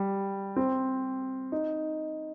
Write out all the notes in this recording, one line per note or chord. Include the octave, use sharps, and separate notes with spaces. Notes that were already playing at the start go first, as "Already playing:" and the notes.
Already playing: G3
C4
D#4